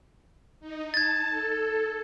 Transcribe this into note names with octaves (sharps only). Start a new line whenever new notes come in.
D#4
A5 G#6 A6
A4